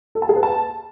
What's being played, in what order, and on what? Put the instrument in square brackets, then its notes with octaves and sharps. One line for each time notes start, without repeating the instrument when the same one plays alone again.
[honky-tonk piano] A4
A5
G#4
B4
A5